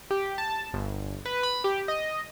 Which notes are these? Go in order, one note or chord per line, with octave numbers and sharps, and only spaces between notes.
G4
A5
G1
B4
B5
G4
D#5